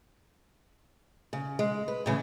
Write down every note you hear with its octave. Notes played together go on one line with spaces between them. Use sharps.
C#3
G#3
B4
A2 C#3 E3